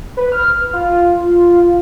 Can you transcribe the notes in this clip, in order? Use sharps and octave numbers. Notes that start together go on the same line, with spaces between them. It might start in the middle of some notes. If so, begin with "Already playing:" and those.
B4
F6
F4